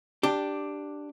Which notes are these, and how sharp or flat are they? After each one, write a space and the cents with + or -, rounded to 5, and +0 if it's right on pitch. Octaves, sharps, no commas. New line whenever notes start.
D4 +5 G4 +0